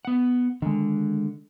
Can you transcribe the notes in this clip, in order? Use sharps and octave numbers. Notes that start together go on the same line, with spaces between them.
B3 F#5
D3 D#3 G#3